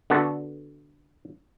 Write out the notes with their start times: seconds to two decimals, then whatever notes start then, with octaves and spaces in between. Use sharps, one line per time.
0.10 D3 B3 F#4 A4